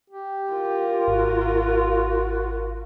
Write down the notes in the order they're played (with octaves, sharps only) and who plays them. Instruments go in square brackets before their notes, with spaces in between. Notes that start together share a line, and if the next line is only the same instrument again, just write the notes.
[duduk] G4
[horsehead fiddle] F4 A#4
[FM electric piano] G#1 [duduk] F#4